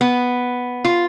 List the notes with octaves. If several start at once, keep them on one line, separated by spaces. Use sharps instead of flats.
B3
F4